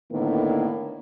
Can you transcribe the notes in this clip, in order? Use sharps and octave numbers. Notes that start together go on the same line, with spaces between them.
A2 D3 D#3 A#3 B3